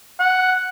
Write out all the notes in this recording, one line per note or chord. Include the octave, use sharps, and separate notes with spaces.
F#5